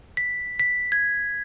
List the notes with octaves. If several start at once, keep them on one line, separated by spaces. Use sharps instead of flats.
B6
B6
G#6